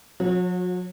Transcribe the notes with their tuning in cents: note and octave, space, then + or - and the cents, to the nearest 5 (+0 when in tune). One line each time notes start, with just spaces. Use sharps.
F#3 -45 F#4 -30 C#5 -5